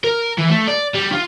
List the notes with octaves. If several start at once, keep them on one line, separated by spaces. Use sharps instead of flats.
A#4
E3
A3
D5
G3
F4